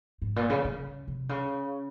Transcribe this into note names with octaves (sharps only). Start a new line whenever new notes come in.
G#2
A#2
C#3
C#3
C3
C#3